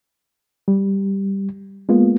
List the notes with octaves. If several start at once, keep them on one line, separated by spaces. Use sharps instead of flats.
G3
G#3 A#3 B3 F4